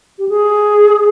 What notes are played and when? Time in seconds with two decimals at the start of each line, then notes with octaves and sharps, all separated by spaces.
0.19 G4
0.29 G#4